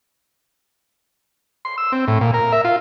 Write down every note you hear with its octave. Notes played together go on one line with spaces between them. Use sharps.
C6
E6
C4
A2
A#2
A#4
E5
F4